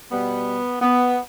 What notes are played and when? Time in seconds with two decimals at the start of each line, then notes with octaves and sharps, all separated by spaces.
0.10 B2 G3 B3
0.81 B3